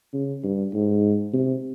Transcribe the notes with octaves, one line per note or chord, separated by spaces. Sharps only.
C#3
G2
G#2
C3